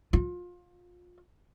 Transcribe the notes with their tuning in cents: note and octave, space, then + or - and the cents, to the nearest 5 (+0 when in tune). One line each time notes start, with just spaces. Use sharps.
F4 +25